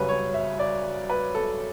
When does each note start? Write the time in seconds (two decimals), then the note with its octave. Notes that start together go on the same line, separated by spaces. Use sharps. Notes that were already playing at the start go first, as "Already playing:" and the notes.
Already playing: F#2 C#3 G3 B4
0.09 C#5
0.34 E5
0.59 D5
1.10 B4
1.35 A4